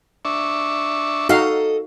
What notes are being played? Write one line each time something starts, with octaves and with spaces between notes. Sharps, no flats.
D4 E5 C#6
D#4 F#4 A4 D#5 F5